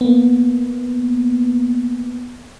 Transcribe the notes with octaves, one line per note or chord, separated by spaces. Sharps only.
A#3 B3